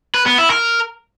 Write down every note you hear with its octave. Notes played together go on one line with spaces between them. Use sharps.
B4
B3
E4
A#4